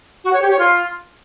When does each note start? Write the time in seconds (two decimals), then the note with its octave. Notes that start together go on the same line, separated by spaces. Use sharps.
0.24 F#4
0.33 C#5
0.42 G4
0.50 C#5
0.59 F4